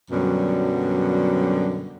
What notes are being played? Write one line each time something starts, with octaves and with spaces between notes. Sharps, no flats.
F#2 B2 D3 F#3 G3